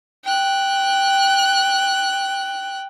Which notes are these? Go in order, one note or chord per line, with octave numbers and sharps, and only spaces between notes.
G5 F#6